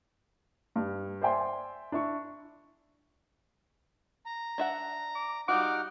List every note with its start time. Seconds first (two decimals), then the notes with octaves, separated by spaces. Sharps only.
0.76 G2
1.22 C5 D5 E5 G5 G#5 C6
1.92 D4 E4 C#6
4.26 A#5
4.58 D4 E5 F#5
5.16 D6
5.49 G3 D#4 F4 F#4 F#5 D6 F6